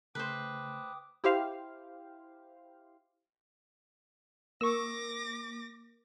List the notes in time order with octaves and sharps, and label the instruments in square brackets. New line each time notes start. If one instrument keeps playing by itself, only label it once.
[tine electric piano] C#3 A3 [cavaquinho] B4 C5 [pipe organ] G5 D6 D#6
[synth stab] E4 G4 C5 F5
[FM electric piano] A#3 [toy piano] A#4 [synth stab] C#6 E6 [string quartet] D6 A#6